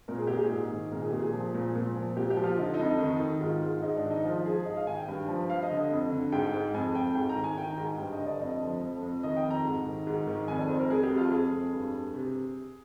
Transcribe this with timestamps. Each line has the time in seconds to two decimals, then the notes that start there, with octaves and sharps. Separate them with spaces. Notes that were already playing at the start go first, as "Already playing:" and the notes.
0.08 A#2 A#4
0.18 G#4
0.27 A#2 G4
0.36 G#4
0.50 G#2
0.71 D#3
0.91 A#2 A#4
1.01 G#4
1.10 A#2 G4
1.19 G#4
1.33 F3
1.54 A#2
1.75 A#2
1.96 F3
2.16 A#2 G4
2.30 G4
2.37 F3
2.44 F4
2.57 D3 D#4
2.65 F4
2.74 D#4
2.79 F2
3.00 D#3
3.20 D#3
3.41 G#2 F4
3.62 G#2
3.82 G#2 D#4
3.97 D4
4.04 D#3
4.10 D#4
4.24 F3 F4
4.45 F3 G#4
4.65 G#2 D#5
4.76 F5
4.87 D#3 G#5
4.97 G5
5.08 G2
5.28 F3
5.49 G2 F5
5.62 D#5
5.70 D3
5.77 D#5
5.91 F2
6.12 D3
6.32 G#2 G5
6.54 G#2
6.74 F2 G#5
6.95 F2 G5
7.15 G#2 G5
7.29 A#5
7.36 D#3
7.44 G#5
7.57 D#3 G5
7.71 A#5
7.77 G#2
7.85 G#5
7.98 G2 G5
8.13 D#5
8.19 D3
8.26 D5
8.40 F2 D#5
8.62 F3
8.82 F2
9.02 F2
9.23 D#3 D#5
9.37 G5
9.45 F2
9.50 A#5
9.65 G#2
9.86 D#3
10.07 G#2
10.27 D#3
10.48 F2 G#5
10.59 D5
10.69 F2 C5
10.80 A#4
10.90 F2 G#4
11.03 G4
11.10 F2
11.18 F4
11.31 F2 G#4
11.53 F2
11.73 G2
11.93 G2
12.14 C3